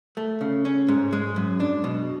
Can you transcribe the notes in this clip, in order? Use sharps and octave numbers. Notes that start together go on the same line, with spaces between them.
A3
C#3
C#4
G#2
G#3
F#2
D4
B2